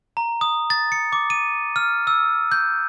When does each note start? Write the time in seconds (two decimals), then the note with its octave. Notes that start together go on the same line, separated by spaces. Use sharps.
0.17 A#5
0.41 D#6
0.70 A6
0.92 C#7
1.12 D6
1.30 D#7
1.76 F6
2.07 E6
2.52 G6